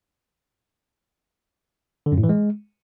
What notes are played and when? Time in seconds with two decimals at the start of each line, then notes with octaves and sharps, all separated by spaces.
2.06 D3
2.12 F#2
2.18 A2
2.24 E3
2.29 G#3